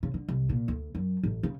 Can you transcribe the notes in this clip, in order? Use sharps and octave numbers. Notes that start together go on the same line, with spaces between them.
C#3
D3
C2
A#2
D2
F#2
A1
C#3